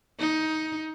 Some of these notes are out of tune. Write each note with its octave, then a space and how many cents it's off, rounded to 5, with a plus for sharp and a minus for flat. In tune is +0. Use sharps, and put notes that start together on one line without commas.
D#4 +15